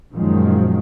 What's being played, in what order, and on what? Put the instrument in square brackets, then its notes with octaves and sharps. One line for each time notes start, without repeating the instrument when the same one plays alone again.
[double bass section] F#2 A#2 D#3 F3 F#3 G#3